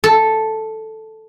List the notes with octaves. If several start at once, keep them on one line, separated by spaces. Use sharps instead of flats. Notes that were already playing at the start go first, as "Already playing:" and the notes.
A4